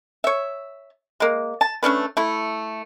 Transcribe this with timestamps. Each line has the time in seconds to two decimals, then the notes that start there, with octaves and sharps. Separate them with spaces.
0.24 C#5 E5
1.20 G#3 A#3
1.61 A5
1.83 A3 C#4 D4 B4
2.17 A3 E4